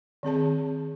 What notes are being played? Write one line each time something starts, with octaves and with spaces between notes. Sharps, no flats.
D#3 C4 G#4 A5